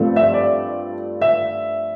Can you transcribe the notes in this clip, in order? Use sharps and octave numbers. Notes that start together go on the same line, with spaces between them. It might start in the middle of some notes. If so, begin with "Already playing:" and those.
Already playing: G2 F3 A3 C4
E5
D5
E5